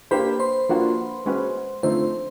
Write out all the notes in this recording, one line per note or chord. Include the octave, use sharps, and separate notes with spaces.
A#3 D4 G4 B4 C5 B5
C5 C6
F3 A#3 D4 F#4
G#3 C#4 F#4 B4
D3 F3 A3 C4 D#4 C5